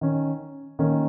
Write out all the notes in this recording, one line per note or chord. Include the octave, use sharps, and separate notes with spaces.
D#3 C#4
D#3 A#3 C#4